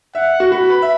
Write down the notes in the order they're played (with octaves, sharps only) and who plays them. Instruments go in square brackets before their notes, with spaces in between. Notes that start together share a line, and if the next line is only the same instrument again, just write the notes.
[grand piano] E5 [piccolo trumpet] F#5
[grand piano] F#4
[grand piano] F#4 [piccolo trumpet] B5
[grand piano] B4
E5